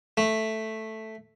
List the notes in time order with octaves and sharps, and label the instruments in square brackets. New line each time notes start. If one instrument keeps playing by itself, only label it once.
[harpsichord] A3